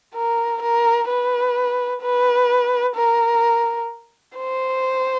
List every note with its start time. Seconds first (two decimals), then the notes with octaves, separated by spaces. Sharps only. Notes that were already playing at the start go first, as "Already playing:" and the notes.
0.15 A#4
0.62 A#4
1.09 B4
2.02 B4
2.96 A#4
4.37 C5